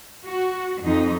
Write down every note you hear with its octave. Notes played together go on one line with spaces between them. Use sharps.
F#4
F2 D#4